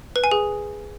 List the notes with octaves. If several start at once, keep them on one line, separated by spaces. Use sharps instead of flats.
B4
G#5
G#4